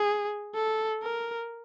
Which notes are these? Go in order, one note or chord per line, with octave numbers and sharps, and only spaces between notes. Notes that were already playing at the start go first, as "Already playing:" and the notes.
Already playing: G#4
A4
A#4